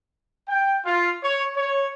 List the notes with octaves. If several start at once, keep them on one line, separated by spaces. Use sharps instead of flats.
G5
F4
C#5
C#5